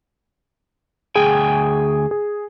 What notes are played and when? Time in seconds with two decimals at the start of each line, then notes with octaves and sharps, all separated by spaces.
1.16 D2 G#4 G5 G#5
2.11 G#4